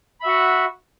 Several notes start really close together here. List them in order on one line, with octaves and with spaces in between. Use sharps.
B5 E5 F#4 F#5